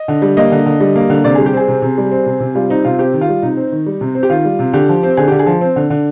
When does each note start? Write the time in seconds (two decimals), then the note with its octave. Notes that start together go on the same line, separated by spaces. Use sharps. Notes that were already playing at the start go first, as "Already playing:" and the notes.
Already playing: D#5
0.08 D3
0.22 G3
0.37 A#3 D#5
0.52 D3
0.66 D3
0.80 G3
0.96 A#3
1.10 D3
1.24 C3 D5
1.35 G3 G#4
1.46 G4
1.53 C4 G#4
1.68 C3
1.82 C3
1.98 G3
2.12 C4
2.26 C3
2.40 C3
2.55 G3 F4
2.70 C4 D#4
2.85 C3 F4
2.99 C4 G4
3.14 D#3
3.21 F4
3.29 G3
3.43 C3 D#4
3.57 C4
3.72 D#3
3.86 G3
4.01 C3
4.15 C4
4.23 G4
4.30 D#3 F4
4.45 G3
4.59 C3
4.73 D3 G4
4.89 F3
5.03 C4
5.17 D3 G#4
5.28 D3 G4
5.39 G#4
5.46 F3
5.61 C4
5.76 D3
5.90 D3